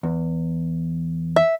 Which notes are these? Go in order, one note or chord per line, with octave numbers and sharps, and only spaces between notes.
E2
E5